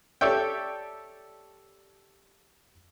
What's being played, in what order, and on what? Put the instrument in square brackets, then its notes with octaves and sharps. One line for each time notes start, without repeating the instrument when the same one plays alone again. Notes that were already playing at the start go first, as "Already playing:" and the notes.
[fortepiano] G4 A4 C#5 D5 E5 G5